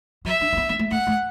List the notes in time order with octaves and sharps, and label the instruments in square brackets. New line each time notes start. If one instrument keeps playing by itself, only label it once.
[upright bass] F#3 [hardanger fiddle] E5
[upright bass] D4
D4
B3
B3
A3
[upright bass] A3 [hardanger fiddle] F#5
[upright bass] A3